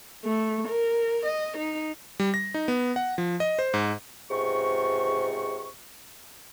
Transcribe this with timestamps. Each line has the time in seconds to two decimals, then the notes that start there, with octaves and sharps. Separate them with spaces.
0.25 A3
0.68 A#4
1.26 D#5
1.57 D#4
2.20 G3
2.34 A#6
2.54 D#4
2.68 B3
2.96 F#5
3.18 F3
3.40 D#5
3.59 C5
3.74 G#2
4.31 C#2 G#2 C3 C#6